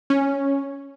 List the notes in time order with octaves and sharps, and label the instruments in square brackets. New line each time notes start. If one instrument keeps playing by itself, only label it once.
[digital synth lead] C#4